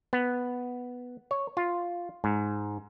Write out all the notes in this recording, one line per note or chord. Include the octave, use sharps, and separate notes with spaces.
B3
C#5
F4
G#2